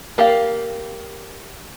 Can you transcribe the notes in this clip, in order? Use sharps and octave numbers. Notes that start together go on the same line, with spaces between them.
A#3 G4 D5 F5